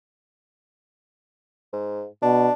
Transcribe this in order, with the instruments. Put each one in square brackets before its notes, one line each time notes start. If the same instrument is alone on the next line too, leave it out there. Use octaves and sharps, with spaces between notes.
[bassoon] G#2
[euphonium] B2 [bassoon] D4